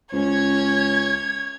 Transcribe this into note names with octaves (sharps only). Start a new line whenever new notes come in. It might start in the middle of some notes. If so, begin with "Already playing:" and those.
C#2 C#4 C#5 G#6